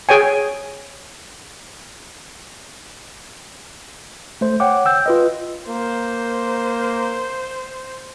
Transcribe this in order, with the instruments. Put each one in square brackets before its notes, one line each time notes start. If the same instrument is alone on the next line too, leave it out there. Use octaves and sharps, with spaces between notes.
[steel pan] G#4 C#5 G5 G#5
[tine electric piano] A3 C5
C#5 F#5 G5 D6
G5 E6 G6
F4 B4 D#5
[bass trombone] A#3 [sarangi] C5